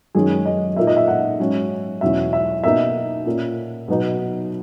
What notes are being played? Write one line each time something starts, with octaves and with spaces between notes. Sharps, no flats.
F#2 D#3 G#3 C#4 G#4
D#5
A#2 A#3 D#4 E5
D#5
E5
F#5
G#2 F#3 C#4
E2 B2 F#3 C#4 E5
E5
B2 A#3 D#4 E5
A#2 A#3 C#4
B2 F#3 B3 D#4